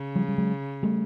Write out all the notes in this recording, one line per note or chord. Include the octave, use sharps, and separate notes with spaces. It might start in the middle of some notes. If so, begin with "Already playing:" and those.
Already playing: C#3
F3 G3
G3
F#3 G#3
G3 A3